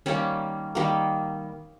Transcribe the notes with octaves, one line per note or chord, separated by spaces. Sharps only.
D#3 G3 A#3 C#4
D#3 G3 A#3